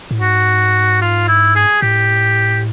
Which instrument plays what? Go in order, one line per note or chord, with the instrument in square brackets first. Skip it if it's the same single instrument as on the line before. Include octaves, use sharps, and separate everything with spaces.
[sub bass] A2
[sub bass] G#2 [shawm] F#4
[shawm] F4
E4
G#4
[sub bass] A2 [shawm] G4